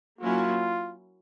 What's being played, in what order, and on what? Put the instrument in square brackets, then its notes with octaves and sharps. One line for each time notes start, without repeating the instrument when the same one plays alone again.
[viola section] F#3 A#3 C#4 E4 [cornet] F4